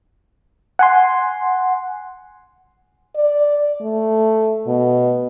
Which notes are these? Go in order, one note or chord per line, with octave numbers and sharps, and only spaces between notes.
F#5 G#5 C6
D5
A3
B2